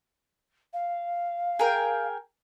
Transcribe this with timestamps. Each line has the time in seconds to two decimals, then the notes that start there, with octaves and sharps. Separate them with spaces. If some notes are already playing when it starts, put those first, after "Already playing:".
0.73 F5
1.59 G#4 A#4 G5